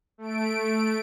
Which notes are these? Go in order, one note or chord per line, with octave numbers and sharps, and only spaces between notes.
A3 D7